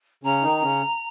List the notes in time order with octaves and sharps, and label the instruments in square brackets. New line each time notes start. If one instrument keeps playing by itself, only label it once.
[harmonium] C#3 C#4 [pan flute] A#5
[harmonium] D#3 D#4
C#3 C#4